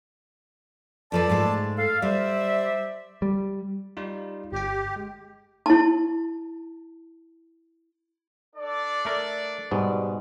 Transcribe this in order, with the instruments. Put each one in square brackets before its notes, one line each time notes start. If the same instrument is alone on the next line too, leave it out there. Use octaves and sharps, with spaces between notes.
[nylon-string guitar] F2 F3 B4 [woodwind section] A4 D5 A5
[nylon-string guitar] G#2 G#3 A3
[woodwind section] A4 F5
[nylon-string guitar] G3 [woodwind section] C5 D5 E5
[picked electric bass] G3
[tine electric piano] G3 D#4 F4
[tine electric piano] G1 G5 [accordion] G4
[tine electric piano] G#3
[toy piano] E4 A5
[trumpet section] D4 A4 D5
[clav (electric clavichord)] A3 A#4
[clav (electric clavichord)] G#2 B2 [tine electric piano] G3